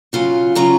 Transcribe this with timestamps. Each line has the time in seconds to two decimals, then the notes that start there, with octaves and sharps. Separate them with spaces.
0.13 C#3 F#3 C#4 F4
0.55 C#3 F#3 C#4 F4 A#5